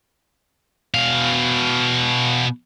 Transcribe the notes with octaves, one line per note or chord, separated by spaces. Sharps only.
B2 F5